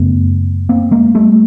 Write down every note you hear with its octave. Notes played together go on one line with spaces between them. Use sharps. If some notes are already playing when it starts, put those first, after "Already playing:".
Already playing: F#2 C#3 A3 B3
A#3 C4
G#3 A#3
G3 A3